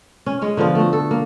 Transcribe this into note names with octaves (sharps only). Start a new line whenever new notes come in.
C#4
G#3 C#4 C#5
D3 F3 B3 F4
A3 F#4
A4
A#3